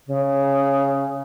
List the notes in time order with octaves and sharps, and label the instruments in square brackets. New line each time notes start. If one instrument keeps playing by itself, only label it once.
[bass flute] C#3